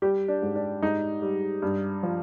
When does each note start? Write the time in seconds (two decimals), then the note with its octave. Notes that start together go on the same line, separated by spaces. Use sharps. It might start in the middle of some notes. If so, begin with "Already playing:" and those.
0.02 G3 G4
0.28 D4
0.42 G#2
0.55 D4
0.83 G#2 D#4
1.22 G3
1.62 G2
2.03 F3